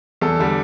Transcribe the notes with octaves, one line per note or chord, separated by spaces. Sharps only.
E2 A4
D3 G3